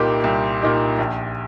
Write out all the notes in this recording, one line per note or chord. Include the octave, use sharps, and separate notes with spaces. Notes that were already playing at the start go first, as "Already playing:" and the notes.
Already playing: C2 A#2 A#3 D#4 G4
C2
A#2 A#3 D#4 G4
A#1